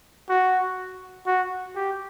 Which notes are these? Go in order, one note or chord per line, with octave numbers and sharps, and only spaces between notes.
F#4
F#4
G4